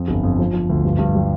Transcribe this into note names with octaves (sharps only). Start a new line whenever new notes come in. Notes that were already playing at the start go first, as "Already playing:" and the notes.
Already playing: F2
G1
F2
F3
F3
D2
G2
G2
G3